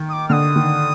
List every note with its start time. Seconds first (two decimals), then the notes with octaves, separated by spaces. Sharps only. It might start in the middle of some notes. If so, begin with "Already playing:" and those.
Already playing: D#3
0.09 D#6
0.13 D6
0.29 D3 F6
0.33 D#6
0.56 D#3